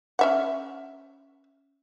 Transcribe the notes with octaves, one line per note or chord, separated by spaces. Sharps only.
C#4 E5 F#5